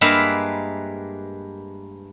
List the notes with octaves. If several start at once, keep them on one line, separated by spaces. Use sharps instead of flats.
G2 G#3 A#3 B4 E5 F5